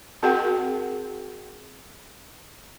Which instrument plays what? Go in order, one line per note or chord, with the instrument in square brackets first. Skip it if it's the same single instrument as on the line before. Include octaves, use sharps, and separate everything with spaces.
[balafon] C4 F#4 G#4 A#4 F#5 G5